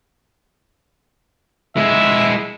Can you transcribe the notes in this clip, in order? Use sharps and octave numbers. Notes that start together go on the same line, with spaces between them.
G#3 E4 E5